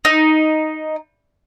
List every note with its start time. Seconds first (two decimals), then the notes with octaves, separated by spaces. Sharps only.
0.05 D#4